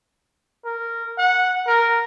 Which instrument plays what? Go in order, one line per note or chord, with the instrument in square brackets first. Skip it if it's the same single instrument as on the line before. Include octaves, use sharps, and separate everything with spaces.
[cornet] A#4
F#5
A#4